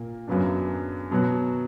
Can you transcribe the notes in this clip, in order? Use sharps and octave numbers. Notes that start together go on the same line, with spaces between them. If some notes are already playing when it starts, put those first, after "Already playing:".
Already playing: A#2 A#3
F#2 C#3 F#3 B3 D4
B2 F#3 B3 F#4